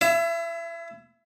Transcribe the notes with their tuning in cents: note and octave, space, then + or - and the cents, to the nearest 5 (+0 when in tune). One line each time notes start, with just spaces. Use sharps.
E4 +30 E5 +0